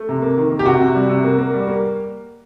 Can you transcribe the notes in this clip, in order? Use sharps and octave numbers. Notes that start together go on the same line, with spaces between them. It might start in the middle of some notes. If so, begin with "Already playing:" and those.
Already playing: A3
C3
A#3
D#3
A#3
G4
C3 F#4
C3
G3
C3
A#3
A#3
G3
A#3